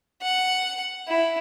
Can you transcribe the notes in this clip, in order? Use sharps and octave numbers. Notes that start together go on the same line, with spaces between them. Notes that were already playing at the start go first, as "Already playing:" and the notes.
F#5
E4